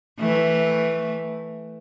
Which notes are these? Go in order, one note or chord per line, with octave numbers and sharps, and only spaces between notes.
E3 A3